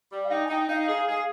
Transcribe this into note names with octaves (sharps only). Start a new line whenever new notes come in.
G3
F5
D#4 G5
G#5
D#4 G5
D#4 F5
G#4
G#4